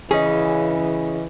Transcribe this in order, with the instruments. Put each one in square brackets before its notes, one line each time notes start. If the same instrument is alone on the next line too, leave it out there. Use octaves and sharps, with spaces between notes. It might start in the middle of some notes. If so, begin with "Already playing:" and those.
[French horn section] C#3 E3 [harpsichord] C#4 D#4 [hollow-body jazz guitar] G#4